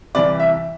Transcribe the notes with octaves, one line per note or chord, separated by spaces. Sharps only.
C2 C3 E3 D5
E5